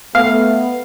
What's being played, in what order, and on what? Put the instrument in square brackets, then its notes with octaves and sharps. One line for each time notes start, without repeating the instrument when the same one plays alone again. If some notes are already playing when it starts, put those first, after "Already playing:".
[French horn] A3 [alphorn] B3 [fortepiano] F5